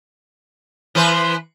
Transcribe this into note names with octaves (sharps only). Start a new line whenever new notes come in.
E3 B4 C5